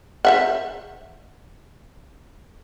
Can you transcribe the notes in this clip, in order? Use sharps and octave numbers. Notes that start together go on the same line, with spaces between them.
C5 E5 F#5